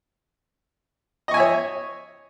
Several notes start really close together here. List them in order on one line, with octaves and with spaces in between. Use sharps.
D#5 C#6 G#5 E5 C#5